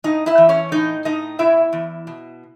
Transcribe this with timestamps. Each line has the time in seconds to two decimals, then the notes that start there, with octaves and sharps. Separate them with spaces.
0.04 A2 D#4 D#5
0.26 E4 E5
0.38 E3
0.49 C#4 C#5
0.72 A2 D#4 D#5
1.05 A2 D#4 D#5
1.39 B2 E4 E5
1.73 E2
2.07 B2